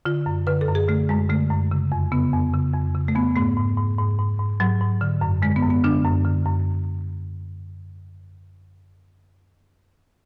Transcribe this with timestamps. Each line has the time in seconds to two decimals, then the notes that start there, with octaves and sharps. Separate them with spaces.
0.05 D3 F4
0.26 F#2
0.47 D3 B4
0.61 A4
0.68 F#2
0.75 G#4
0.88 D3 A3
1.09 F#2 G#3
1.29 D3 A3
1.50 F#2
1.71 C#3
1.92 F2
2.12 C#3 B3
2.33 F2
2.54 C#3
2.74 F2
2.95 C#3
3.08 A3
3.15 F2 B3
3.36 G#2 A3
3.57 G#2
3.77 G#2
3.98 G#2
4.19 G#2
4.39 G#2
4.60 G#2 F#3
4.81 G#2
5.01 D3
5.21 F#2
5.42 D3 G#3
5.56 B3
5.63 F#2
5.70 B3
5.84 D3 D4
6.04 F#2
6.25 D3
6.46 F#2